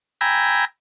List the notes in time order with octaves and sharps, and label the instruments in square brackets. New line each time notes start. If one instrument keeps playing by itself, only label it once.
[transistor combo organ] G5 G#5 A#5 B5 E6